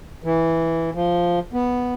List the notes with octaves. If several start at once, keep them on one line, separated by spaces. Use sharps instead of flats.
E3
F3
B3